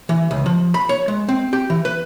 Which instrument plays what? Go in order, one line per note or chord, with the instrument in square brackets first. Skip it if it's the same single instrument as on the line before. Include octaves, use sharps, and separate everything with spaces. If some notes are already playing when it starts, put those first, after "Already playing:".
[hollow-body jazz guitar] E3
C#2
F3
B5
C#5
G#3
C4
G4
E3
B4